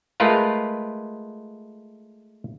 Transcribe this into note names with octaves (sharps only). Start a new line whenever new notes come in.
G#3 A3 F4 A#4 B4 F5